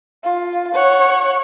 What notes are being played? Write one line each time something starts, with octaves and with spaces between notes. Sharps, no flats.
F4
C#5 F#5